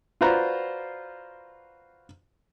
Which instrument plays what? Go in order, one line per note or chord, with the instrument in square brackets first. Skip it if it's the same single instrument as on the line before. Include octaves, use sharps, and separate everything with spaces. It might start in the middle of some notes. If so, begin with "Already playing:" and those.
[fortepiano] F4 F#4 B4 C5 D5 A#5